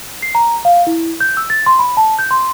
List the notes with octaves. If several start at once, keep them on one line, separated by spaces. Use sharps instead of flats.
C7
A#5
F5
E4
G6
E6
A6
C6
B5
A5
G6
C6